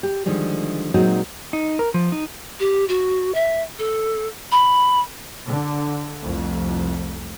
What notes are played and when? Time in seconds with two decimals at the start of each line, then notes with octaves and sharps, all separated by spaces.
0.03 G4
0.26 D3 D#3 F3 G3 G#3
0.94 A#2 F#3 G#3 C4 D#4 F#4
1.53 D#4
1.79 A#4
1.94 F3
2.12 D#4
2.60 G4
2.88 F#4
3.34 E5
3.79 A4
4.52 B5
5.48 D3
6.23 C2 F2 A3